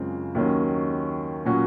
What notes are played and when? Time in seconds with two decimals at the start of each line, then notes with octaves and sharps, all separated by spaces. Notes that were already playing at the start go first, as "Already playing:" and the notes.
Already playing: F#2 C#3 G#3 C4 F4
0.35 D#2 D#3 F#3 C#4
1.45 A#2 F#3 C#4 F#4